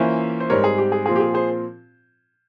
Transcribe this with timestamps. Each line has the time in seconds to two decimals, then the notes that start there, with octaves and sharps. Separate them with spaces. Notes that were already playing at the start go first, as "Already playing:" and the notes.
Already playing: E3 A#3 C#4 F4 C5 E5
0.40 C5
0.50 G#2 G3 C4 A#4 C#5
0.64 G#4
0.78 G4
0.92 G#4
1.06 A#2 F3 C4 F4 G#4
1.16 G4
1.20 G#4
1.34 G#4 C5